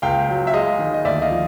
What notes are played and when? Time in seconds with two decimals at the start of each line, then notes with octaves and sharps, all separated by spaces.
0.02 C#2 F5 G5
0.29 F#3
0.47 E5
0.54 G#3 D#5 F5
0.79 D#3
0.94 D#5
1.05 D2 D5 E5
1.22 D#5 F5
1.31 F3